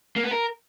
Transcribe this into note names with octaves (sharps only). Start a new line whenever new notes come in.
A#3
B3
A#4